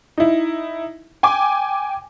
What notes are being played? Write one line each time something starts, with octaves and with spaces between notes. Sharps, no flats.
D#4 E4
G5 G#5 D6